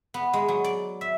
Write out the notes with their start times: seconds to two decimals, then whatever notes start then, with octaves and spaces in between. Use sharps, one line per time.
0.14 B3
0.33 G#3
0.48 F#3
0.64 D5
1.01 E5